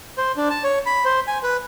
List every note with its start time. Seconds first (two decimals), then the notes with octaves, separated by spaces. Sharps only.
0.18 C5
0.37 D4
0.50 A5
0.64 C#5
0.86 B5
1.05 C5
1.28 G#5
1.43 B4